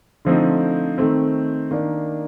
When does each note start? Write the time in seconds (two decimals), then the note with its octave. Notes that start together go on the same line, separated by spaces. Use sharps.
0.25 D3 F3 A3 C4 D#4
0.98 D#3 A3 C4
1.71 D#3 A#3 D4